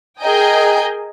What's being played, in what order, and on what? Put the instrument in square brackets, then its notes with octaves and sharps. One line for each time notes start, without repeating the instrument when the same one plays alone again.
[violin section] G#4 A#4 D#5 G5 G#5 G6